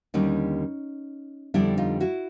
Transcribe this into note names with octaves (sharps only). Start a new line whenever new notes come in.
D#2 D3 G3 C#4 D#4
F2 D3 G3 B3 D4 E4
D#4 F4
E4 F#4